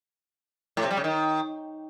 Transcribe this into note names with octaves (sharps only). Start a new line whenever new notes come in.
A2
C3
G3
C#3
D#3